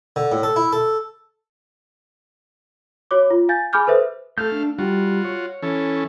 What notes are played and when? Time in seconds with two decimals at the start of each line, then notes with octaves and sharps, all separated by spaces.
0.16 D3
0.32 A2
0.43 A4
0.56 E4
0.73 A4
3.11 F#4 C#5 D6
3.30 F4
3.49 F5 G#5 G6 A6
3.73 G#4 G#5 B5 D6 F6 G6
3.87 A4 B4 C5 E5
4.38 A3 A4 F5 G6
4.52 D4
4.78 G3 F4 F#4
5.25 C#5
5.63 E3 C#4 A4